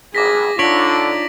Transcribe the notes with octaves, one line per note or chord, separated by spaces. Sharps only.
G#1 G2 G#4 D6 A#6 B6
D3 D4 D#4 F4 C#5 B6 D7 F#7